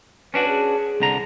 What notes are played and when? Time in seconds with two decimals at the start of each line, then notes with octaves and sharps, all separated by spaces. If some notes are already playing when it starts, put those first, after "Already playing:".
0.34 C#4 D4 F#4 B4
0.48 G#4
1.00 C2 D3 A#5